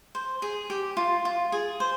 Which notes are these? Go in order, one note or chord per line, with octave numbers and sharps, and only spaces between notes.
C5
G#4
G4
F4
F4
G#4
C5